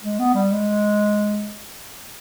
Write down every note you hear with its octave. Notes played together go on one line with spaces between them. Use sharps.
G#3
B3
G3
G#3